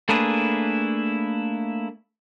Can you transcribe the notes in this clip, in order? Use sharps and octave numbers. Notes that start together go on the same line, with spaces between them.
A3 A#3 D4 E4 G#4 B4